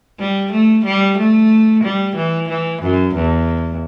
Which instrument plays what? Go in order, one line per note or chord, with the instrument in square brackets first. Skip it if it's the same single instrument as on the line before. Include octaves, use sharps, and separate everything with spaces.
[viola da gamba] G3
A3
G3
A3
G3
E3
E3
F#2
E2